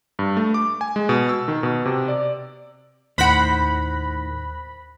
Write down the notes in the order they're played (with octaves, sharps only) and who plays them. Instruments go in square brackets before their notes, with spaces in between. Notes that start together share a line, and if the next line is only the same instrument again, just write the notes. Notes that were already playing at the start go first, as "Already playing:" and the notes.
[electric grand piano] G2
A3
D6
G#5
G#3
B2
E6
D#3
B2
C3
D5
[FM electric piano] D#2 F#6 A#6 [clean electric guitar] A2 D#3 [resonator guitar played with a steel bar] C5 F#5 [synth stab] B5